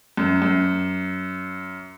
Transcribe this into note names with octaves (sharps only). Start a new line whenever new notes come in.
F#2
F#2